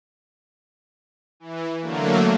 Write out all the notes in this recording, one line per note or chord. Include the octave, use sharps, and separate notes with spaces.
E3
D3 F#3 A3 A#3